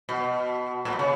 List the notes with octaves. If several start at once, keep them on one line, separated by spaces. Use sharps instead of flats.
B2
A#2
B2
C#3